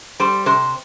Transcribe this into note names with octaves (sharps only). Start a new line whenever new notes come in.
G3 C5
C3 C5